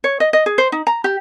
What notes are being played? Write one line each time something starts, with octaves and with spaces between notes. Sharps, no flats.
C#5
D#5
D#5
G#4
C5
D#4
A#5
G4